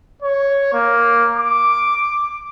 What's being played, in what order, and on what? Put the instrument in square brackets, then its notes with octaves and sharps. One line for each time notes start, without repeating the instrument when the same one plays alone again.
[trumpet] C#5
A#3
D6